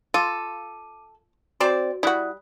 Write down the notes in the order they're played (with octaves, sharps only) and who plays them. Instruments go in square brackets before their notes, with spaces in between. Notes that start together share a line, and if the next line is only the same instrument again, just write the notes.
[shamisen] F4 [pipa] A4 [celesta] D6 D#7
[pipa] C4 C5 D5 [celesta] F#4
[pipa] G3 [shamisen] E4 F#4 [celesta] D5 D#6 F#6